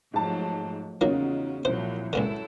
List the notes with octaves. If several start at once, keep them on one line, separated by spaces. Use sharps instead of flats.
G#2 F3 F#3 A3 A5
E2 C#3 F#3 A#3 C#4 D#4 F4 F#4
C2 A#2 F3 F#3 C5
C#2 A#2 D3 F#3 E4 A4